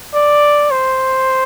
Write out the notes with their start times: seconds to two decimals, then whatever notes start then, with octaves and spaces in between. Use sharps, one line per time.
0.14 D5
0.71 C5